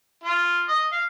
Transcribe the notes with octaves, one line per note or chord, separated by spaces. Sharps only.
F4
D#5
F5